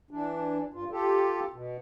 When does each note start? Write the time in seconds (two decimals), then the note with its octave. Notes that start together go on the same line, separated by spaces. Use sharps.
0.11 E3 D4
0.74 G2 F4
0.91 F4 G4 A4
1.53 B2